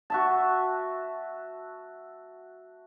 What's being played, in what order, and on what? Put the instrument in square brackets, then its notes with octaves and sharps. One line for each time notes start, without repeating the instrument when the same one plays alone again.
[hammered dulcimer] F#4 E5 A5